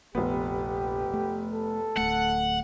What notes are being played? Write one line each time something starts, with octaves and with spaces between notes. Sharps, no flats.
F1 A#1 B3 G4
A3
A4
D1 A3 F#5